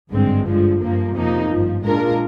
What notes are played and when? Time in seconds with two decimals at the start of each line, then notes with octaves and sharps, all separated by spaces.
0.12 G#1 G2 D3 G#3 C4
0.46 G2 D3 F3 G#3
0.81 G2 F3 A#3
1.16 F2 C3 F3 A#3 D#4
1.50 G#1 G2 F3
1.84 A#2 G#3 D4 F4 A#4